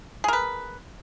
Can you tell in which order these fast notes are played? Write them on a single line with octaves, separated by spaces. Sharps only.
G#4 A#4 B4